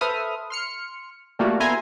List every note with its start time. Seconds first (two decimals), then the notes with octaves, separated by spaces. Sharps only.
0.01 A4 B4 C5 E5 D#6 F6
0.50 C6 F6 C#7
1.39 G3 A3 A#3 F4 F#4
1.60 B3 E4 A4 G#5 A#5 C6